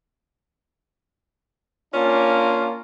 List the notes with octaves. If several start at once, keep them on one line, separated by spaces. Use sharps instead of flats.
A#3 C#4 D4 F4